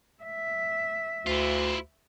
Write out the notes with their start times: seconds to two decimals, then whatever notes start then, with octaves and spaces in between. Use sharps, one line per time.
0.24 E5
1.27 D2 E4 F4